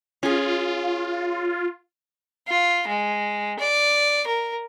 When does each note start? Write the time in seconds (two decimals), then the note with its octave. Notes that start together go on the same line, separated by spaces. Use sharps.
0.23 C#4 F4 G#4
2.48 F4
2.88 G#3
3.59 D5
4.27 A#4